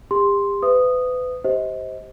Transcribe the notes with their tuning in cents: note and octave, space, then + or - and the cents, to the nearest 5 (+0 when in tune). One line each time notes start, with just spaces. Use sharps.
G4 +35 C6 +0
B4 +35 E5 +30 D#6 -10
G4 -10 C5 +0 D#5 +30